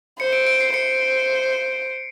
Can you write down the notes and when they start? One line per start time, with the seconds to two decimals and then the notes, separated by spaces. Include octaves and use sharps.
0.19 C5 C#7
0.33 D7
0.47 D7
0.61 C7
0.73 C5 C#7